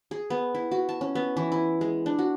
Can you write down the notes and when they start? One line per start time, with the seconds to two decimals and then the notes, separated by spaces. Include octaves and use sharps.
0.11 G#4
0.30 B3
0.55 E4
0.71 F#4
0.89 A5
1.01 C#4
1.15 B3
1.37 E3
1.52 E4
1.81 G#3
2.06 D4
2.19 F#4